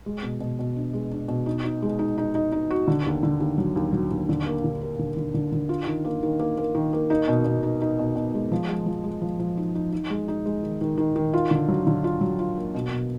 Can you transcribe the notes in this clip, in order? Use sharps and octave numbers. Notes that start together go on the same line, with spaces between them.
G#3
B2
B2
B2
D4
G#3
D4
B2
D#4
D#4
G#3
D#4
D#4
D#4
D#4
F#4
D3
D#2
D3
D#2
F#3
D#2
F#3
D#2
D3
A#3
D3
A#3
D3
D3
D3
D3
F4
D#3
A#3
D#3
A#3
A#3
D#3
A#3
D#4
B2
B2
D#4
D#4
B2
B2
G#3
F3
G#3
F3
G#3
F3
F3
D#4
D#4
D#4
G#3
D#4
G#3
D#3
D#3
D#3
D#3
F4
D3
F#3
D3
F4
F#3
F4
A#3
B2
B2